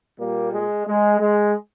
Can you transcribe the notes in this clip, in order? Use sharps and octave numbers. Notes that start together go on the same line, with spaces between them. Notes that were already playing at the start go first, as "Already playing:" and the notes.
A#2 G3 A#3
G#3
G#3
G#3